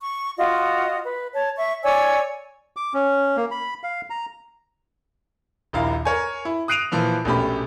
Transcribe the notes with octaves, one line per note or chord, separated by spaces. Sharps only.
C#6
F4 F#4 D#5
B4
C#5 A5
E5 C#6
C#5 D5 G#5 E6
D6
C#4
A#3
B5
F5
A#5
D#1 A#1 E4 F5 A#5
A#4 C#5 G#5
E4
D#6 F#6 C7 D7 D#7 F7
A#2 E3 F3
A#1 B2 A3 C#4 G4 B5